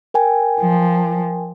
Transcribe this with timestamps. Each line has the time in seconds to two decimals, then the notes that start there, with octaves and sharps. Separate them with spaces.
0.14 A#4 G5 G#5
0.60 F3